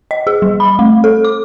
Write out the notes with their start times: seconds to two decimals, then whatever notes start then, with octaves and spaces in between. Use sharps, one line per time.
0.11 D#5
0.27 G#4
0.42 G3
0.60 B5
0.79 A3
1.04 A4
1.25 D6